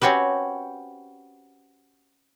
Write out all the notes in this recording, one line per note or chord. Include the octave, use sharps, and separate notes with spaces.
C4 C#4 F#4 G4 B4